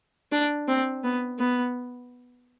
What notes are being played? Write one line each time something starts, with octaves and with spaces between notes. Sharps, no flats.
D4
C4
B3
B3